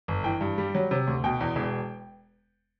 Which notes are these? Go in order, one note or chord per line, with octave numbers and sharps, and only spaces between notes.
G1
E3 G5
G2
G3
F#3
C3
D2
B2 G5
E2
E1